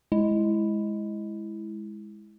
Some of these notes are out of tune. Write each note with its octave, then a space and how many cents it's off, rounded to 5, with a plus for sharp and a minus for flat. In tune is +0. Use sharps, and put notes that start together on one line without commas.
G#3 +5 E4 +0